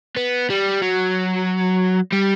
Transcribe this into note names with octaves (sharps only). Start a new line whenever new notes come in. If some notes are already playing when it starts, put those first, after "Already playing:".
B3
G3
F#3
G3